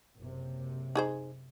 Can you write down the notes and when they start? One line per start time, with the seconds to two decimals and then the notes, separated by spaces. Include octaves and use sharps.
0.16 F#1 C3
0.95 D#4 G#4 C5